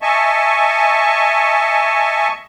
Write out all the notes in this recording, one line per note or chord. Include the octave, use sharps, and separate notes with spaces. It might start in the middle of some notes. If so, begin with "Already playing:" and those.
D#5 E5 G#5 A5 C#6